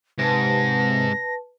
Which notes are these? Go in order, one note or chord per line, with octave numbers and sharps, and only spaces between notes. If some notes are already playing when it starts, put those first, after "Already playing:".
G#2 C3 B4 A5 A#6